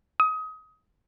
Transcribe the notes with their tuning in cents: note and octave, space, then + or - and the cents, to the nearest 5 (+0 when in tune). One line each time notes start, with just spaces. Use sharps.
D#6 +25